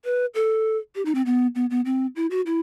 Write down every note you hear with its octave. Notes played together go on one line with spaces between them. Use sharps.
B4
A4
G4
D#4
C4
B3
B3
B3
C4
E4
F#4
E4